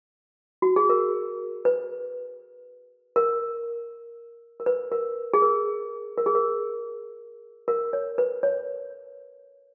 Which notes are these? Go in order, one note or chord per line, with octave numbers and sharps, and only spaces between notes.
F#4
G#4
A#4
B4
A#4
A#4
B4
A#4
G#4
A#4
A#4
G#4
A#4
A#4
C#5
B4
C#5